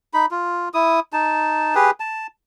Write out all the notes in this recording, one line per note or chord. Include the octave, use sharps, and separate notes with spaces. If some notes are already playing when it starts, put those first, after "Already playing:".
D#4 B5
F4
E4 D#6
D#4 A5
G4 G#4 B4
A5